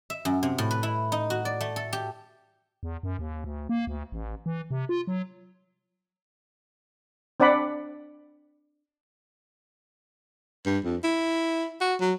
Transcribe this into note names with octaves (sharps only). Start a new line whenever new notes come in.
E5
F#2
C3
A2
B4
E4
D#4
F#4
D5
A3
A4
G4
E2
F#2
D#2
D2
A#3
D2
A1
E3
C3
F4
F#3
C4 D4 D5 F#5 B5
G2
F2
E4
F#4
F#3